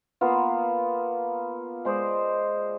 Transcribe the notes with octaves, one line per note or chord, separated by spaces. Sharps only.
A#3 B3 F4
G#3 C5 D5 D#5